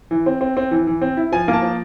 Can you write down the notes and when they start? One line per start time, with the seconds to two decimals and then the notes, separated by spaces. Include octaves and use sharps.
0.11 E3
0.26 C4
0.41 C4
0.57 C4
0.71 E3
0.87 E3
1.02 C4
1.17 E4
1.32 F3 G#5
1.48 A#3
1.53 A5
1.63 F3